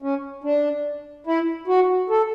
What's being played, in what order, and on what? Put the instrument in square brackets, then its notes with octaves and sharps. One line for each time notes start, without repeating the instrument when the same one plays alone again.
[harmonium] C#4
D4
E4
F#4
A4